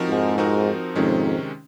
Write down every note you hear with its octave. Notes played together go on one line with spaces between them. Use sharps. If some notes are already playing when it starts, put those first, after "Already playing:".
Already playing: F3 C4 D#4 F#4 A#4
F2 G#2
F3 C4 D#4 F#4 A#4
F2 G#2 C3 D#3 G#3 C#4